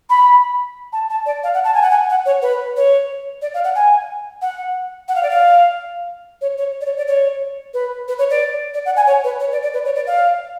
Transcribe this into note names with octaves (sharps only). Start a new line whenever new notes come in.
B5
A5
A5
D5
F5
F#5
A5
G#5
F#5
G#5
F#5
C#5
B4
C#5
D5
F5
F#5
G#5
F#5
F#5
F5
D5
F5
C#5
C#5
D5
C#5
D5
C#5
B4
B4
C#5
D5
D5
F#5
G#5
C#5
B4
C#5
D5
D5
B4
C#5
D5
F5